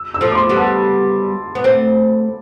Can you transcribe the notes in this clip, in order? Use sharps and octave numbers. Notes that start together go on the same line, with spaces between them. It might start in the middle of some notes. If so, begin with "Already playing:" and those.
Already playing: E6
E6
F3 A3
D6
C6
G3 B3
A5
B3
A3 C4